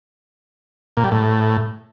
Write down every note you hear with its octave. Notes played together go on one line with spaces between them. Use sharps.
A#2
G3
A2